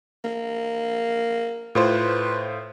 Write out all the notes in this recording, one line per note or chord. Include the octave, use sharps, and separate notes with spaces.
A#3
A2 F4 B4 C5